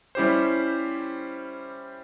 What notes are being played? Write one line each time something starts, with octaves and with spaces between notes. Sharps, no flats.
G3 C#4 E4 G4 C5